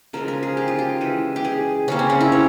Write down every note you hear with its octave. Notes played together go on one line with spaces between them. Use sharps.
C#3 F3 G#3 A#4
A#4
G#4
G4
F4
G4
E3 G#3
G4
G#4
C#3 G3 A#3 C#4
C4
C#4
E4
C#5